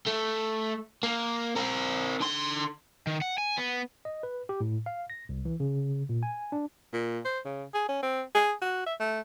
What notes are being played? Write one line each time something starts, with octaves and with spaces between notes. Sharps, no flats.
A3
A#3
C4 A#4
D3 C6
D#3
F#5
G#5
B3
D#5
B4
G4
A2
F5
A#6
C2
E3
C#3
A#2
G#5
D4
A#2
C5
C#3
G#4
C#4
C4
G#4
F#4
E5
A3